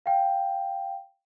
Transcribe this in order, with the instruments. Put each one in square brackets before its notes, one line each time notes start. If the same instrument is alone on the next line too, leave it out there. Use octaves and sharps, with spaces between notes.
[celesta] F5 G5